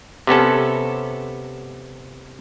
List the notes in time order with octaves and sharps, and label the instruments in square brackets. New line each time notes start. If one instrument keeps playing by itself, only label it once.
[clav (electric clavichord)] C3 B3 C#4 A4